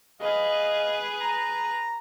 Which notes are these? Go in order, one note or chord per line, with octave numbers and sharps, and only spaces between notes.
G#4 B4 D#5 F5
A#5